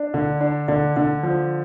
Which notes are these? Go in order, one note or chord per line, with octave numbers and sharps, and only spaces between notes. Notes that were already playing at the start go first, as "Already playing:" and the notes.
Already playing: D4
D3
D4
D3
D3
F3